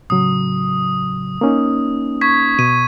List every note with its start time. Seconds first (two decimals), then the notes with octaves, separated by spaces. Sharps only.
0.10 A2 C#3 F#3 D#6
1.41 A#3 C#4 D#4
2.21 C#6 G#6 B6
2.59 B2 D#7